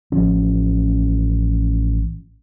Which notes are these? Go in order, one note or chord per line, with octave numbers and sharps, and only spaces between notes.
A1 F3 C#4